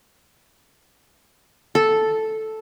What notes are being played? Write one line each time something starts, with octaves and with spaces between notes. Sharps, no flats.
A4